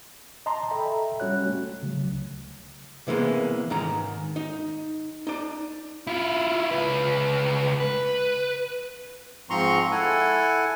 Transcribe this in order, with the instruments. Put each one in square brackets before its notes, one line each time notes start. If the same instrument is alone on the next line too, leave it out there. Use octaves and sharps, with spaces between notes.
[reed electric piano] D#5 A5 A#5 C6
A4 D#5 E5 G5 A#5 B5
G3 C#4 F#4 C#5 F#6
A3
C#3 F#3
C#2
[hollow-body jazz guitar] C3 E3 G#3 A#3 B3
G#2 D#3 A#5
D#4
D#4 D5
[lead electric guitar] E4 F4
C#2 B4
B4
[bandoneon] G#2 F3 C4 A#5 C6 C#6
E4 A4 F#5 G#5